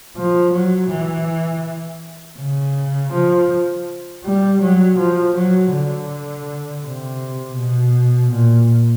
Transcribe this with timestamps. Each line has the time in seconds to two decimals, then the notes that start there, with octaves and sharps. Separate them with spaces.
0.16 F3
0.53 F#3
0.90 E3
2.39 C#3
3.13 F3
4.24 G3
4.62 F#3
4.99 F3
5.36 F#3
5.73 D3
6.84 C3
7.58 B2
8.33 A#2